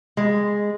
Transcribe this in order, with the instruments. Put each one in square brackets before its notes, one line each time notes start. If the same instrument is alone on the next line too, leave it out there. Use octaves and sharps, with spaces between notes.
[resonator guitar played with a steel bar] G#3